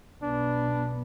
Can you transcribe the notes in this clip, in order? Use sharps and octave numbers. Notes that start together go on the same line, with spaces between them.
B1 B3 D4